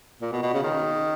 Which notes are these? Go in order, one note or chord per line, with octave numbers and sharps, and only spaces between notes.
A#2
B2
B2
C#3
D#3